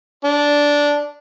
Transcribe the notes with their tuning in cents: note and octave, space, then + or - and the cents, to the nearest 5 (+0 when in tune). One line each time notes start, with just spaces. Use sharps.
D4 -10